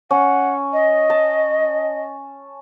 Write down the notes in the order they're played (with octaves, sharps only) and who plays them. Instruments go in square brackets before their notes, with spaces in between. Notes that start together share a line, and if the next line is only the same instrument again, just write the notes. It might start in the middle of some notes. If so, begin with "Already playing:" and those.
[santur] C#4 [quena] F#5
[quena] D#5
[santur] A5